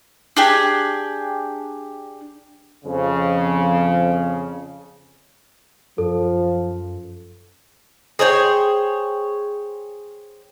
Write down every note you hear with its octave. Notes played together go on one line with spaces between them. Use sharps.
D4 G4 G#4
F2 C#3 F3
F#2 F3 A4
G#4 C5 C#5 G5